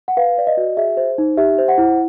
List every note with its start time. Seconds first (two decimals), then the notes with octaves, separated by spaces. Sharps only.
0.08 F#5
0.17 B4 F5
0.38 D5
0.47 D#5
0.57 F#4
0.77 G#4 E5
0.97 C5
1.18 D#4
1.37 G4 E5
1.58 C5
1.68 F#5
1.78 E4